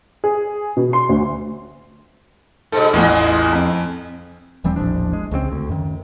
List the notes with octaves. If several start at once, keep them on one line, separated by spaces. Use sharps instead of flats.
G#4
B2
C6
D2
G2 B2 A4
A1 E2 G#3 A#3 F4
F2
D#1 E3 G3 C4
D#1 A1 F3 D4
G#3
C#2 C#3 E3 C4
D2
F#2 D#3